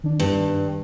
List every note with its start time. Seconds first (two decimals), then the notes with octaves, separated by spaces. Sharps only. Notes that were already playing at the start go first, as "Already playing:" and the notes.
0.04 D#3 D4
0.20 G2